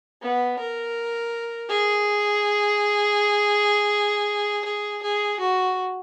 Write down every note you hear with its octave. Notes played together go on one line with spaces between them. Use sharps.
B3
A#4
G#4
G#4
G#4
F#4